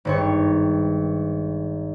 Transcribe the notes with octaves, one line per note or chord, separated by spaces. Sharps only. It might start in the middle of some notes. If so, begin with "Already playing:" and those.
G#1 G2 C#5